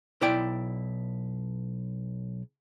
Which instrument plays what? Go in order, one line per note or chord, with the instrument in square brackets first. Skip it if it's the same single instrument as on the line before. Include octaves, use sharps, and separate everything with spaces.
[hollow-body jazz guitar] B1 E4 D5 G5